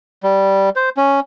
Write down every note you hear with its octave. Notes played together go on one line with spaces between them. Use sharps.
G3
C5
C#4